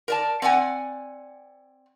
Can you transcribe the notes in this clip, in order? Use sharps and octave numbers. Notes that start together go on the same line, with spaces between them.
A#4 D5 A5
C4 D5 F#5 G#5